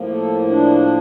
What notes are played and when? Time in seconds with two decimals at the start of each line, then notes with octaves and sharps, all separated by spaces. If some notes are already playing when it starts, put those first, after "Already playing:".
Already playing: A2 F3 A#3
0.12 A4
0.49 D4